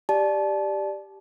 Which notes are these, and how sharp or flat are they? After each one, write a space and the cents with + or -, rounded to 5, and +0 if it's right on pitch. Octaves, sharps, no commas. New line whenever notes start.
G4 +0 D5 +10 A5 -25